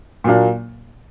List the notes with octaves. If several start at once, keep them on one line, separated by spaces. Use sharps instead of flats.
A#2 F#3 A#3 D4